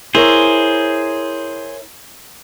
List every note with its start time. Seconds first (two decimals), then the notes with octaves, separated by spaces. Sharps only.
0.15 E4 G#4 A#4 C5 C#5